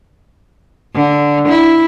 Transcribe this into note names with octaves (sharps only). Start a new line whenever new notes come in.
D3
E4